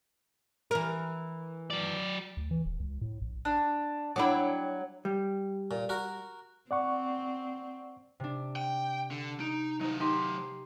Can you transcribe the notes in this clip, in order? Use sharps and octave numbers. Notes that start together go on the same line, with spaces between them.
E3 A#4
F#3 D5
D2
E3
D#1
C#2
A2
A#1
D4
F#3 D4 E4 G5 D6
G3
A#2
F#4 A#4
C4 D5 F#5 C#6
C3 D4
G5
D3
D#4 D7
F#3 D#4 C5
D#4 G4 C6